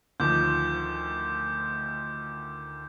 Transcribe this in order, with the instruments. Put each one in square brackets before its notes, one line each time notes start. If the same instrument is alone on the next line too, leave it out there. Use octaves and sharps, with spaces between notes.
[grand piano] D2 D#3 F3 [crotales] D6 G6